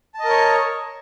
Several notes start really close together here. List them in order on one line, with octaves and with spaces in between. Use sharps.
A5 D#5 A#4 C#5